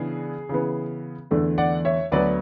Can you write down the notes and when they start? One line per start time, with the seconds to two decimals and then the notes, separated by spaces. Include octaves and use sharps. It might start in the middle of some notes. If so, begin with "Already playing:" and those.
Already playing: C#3 E3 B3 D4 G#4
0.49 C#3 E3 B3
1.31 E2 D3 A3 D4
1.58 D5 F#5
1.85 C#5 E5
2.12 D2 D3 F#3 B3 D4 B4 D5